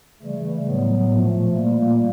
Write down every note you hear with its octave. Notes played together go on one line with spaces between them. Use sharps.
C#3 E3 G3 A3
A2 F#3 B3
A#2 F3 A3
A#2 G3 A#3